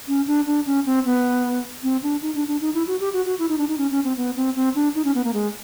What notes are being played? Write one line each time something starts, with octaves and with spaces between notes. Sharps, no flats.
C#4
D4
D4
C#4
C4
B3
C4
D4
D#4
D4
D4
D#4
E4
F#4
G4
F#4
F#4
E4
D#4
D4
D#4
C#4
C#4
C4
B3
C4
C4
D4
D#4
C#4
B3
A#3
G#3